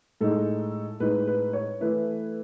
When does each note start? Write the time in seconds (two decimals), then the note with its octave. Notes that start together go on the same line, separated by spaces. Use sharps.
0.21 A2 G#3 D#4 A4
1.00 A2 G#3 D#4 B4
1.27 B4
1.53 C#5
1.80 E3 A3 E4 B4